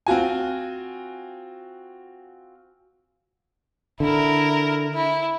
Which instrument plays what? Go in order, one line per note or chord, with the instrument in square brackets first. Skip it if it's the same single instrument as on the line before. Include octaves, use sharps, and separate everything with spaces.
[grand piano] C4 F4 F#4 G#5
[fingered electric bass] D3 [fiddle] E4 A#4
[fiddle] E4